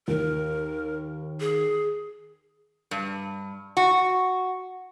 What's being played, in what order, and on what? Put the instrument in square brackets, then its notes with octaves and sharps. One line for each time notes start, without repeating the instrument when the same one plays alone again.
[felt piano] D#2 [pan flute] A#4
[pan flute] G#4
[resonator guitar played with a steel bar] G2
F#4